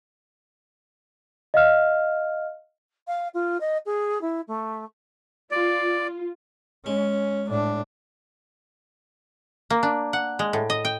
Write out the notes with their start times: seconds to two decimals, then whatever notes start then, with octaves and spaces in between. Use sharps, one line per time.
1.54 D#5 F5 F6
3.07 F5
3.34 F4
3.61 D#5
3.86 G#4
4.21 E4
4.48 A3
5.51 F4 D5
6.86 G#3 C#4
7.47 A2 D4
9.70 A#3
9.83 D4
10.13 F#5
10.39 G#3
10.53 A2
10.70 D#5
10.85 G5